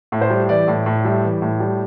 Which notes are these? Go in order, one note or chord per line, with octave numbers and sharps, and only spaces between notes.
A2
C5
G3
E3 D5
A2
A2
G3 E5
E3
A2
G3